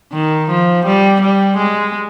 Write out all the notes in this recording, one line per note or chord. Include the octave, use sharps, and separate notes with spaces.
D#3
F3
G3
G3
G#3